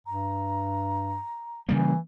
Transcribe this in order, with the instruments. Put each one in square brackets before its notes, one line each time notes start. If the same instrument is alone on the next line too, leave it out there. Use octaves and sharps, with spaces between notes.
[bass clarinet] G2 [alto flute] A#5
[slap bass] C#3 G3 A#3 [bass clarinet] E3